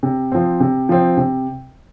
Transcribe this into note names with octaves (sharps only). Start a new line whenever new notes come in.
C3
F3 C4
C3
F3 C4
C3